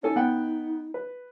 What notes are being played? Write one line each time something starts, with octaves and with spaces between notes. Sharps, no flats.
C#4 D#4 A4 G#5
B3 F#5 G5
B4